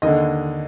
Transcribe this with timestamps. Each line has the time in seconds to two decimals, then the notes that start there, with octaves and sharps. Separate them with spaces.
0.02 D#2 D3 D#5